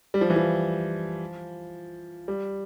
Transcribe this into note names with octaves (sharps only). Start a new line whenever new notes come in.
G3
F3
E3
F3
G3